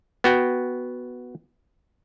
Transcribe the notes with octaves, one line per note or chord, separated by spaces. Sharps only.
B3 F#4 G5